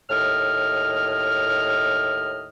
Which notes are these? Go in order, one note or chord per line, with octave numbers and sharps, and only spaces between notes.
D#2 A2 D#5 F6